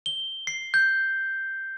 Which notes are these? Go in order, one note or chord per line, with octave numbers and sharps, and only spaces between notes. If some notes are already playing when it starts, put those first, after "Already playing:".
G7
C7
G6